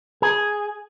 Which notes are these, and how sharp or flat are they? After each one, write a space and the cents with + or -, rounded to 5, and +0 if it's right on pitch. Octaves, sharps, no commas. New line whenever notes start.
G#4 +0